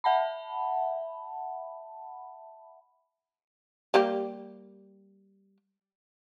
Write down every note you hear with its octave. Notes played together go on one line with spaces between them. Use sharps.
E5 F#5 A5 B5
G3 A#3 G4